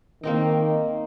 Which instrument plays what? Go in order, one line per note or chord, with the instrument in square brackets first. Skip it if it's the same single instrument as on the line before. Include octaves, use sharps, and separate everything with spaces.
[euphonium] D#3 [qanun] A#3 C4 D#4